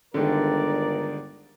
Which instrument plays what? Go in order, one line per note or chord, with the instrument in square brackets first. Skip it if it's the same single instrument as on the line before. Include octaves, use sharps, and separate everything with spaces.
[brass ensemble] G1 A#4 D5 [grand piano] D3 D#3 G#3